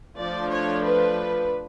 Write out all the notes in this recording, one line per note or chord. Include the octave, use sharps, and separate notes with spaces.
F3 A3 D4 D5
C#5
B4